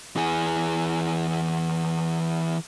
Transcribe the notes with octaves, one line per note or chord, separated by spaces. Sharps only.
E3 G#4